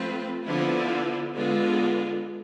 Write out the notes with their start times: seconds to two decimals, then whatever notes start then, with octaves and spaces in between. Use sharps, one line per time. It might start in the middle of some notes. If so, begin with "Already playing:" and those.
Already playing: F3 A3 C4 F4 B4
0.44 D3 F3 B3 E4
1.34 D3 G#3 B3 F4 G#4